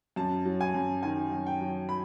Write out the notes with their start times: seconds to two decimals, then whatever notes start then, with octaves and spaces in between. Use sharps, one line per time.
0.16 F#2 A5
0.45 F#3
0.61 G#5
0.75 F#2
1.03 D#3 G#5
1.32 F#2
1.46 G5
1.61 F#3
1.89 B5